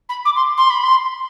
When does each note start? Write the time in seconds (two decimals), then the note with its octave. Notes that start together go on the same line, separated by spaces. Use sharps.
0.09 B5
0.25 D6
0.36 C6
0.57 C6
0.70 B5
0.83 C6